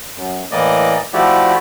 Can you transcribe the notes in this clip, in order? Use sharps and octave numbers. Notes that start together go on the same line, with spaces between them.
F#2
A2 E3 A#3 D5 D#5
F3 A3 E4 F#4 G4 D5